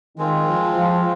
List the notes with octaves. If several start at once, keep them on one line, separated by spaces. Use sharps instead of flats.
D#3 G#3 C4 F4
F3
F3